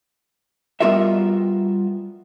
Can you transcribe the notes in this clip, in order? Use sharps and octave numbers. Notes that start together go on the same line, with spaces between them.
G3 B3 F4 F#4 A#4 E5